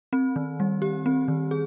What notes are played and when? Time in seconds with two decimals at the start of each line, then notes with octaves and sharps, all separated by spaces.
0.13 C4
0.36 D#3
0.60 G3
0.82 G4
1.06 C4
1.28 D#3
1.51 G#4